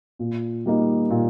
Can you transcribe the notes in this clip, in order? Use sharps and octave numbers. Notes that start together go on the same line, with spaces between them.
A#2
G3 A#3 D#4
A#2